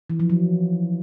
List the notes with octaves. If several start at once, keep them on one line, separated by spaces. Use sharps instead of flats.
E3
F3
F#3